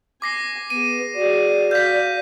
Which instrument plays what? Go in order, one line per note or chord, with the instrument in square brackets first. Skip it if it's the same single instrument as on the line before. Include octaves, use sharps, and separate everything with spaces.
[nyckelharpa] G#5 [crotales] D6 A#6 C7
[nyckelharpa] B3 G#4 [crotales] D#7
[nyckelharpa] F#4 G#4 [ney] D5
[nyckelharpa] F#4 F5 [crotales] G6 B6